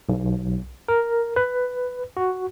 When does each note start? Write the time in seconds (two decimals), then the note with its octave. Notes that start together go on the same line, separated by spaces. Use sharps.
0.09 B1
0.88 A#4
1.36 B4
2.17 F#4